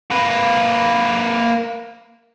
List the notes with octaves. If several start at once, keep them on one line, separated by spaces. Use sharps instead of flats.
A#3 B4